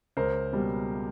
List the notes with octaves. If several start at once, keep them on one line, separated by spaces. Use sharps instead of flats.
C#2 A#4 C5
B2 G3 A#3